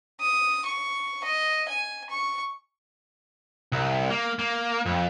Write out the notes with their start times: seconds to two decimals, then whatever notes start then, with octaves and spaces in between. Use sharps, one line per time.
0.20 D#6
0.65 C#6
1.24 D#5
1.69 G#5
2.10 C#6
3.72 C2
4.10 A#3
4.39 A#3
4.86 F2